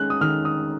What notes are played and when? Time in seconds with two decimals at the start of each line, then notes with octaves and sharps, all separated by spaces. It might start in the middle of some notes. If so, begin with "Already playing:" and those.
Already playing: D#3 G#3 C#4 F#6
0.10 D#6
0.21 D#3 F6
0.45 D#6